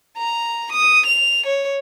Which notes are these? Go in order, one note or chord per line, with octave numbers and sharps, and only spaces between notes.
A#5
D#6
F7
C#5